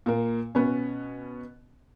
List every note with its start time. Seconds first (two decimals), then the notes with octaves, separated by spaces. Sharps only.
0.06 A#2 A#3
0.55 B2 B3 C#4